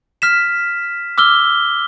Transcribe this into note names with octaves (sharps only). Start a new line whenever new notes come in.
F6 B6 E7
D6 E6 F6 G7